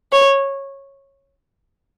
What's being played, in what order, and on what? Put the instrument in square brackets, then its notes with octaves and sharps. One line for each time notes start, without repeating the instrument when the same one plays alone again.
[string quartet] C#5